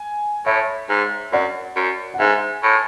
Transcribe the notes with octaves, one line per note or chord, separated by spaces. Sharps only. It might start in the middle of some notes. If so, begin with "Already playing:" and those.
Already playing: G#5
A2 C#5 E5
G#2
F#2 D5 F#5
F#2
F#5
G#2 E5 G#5
A2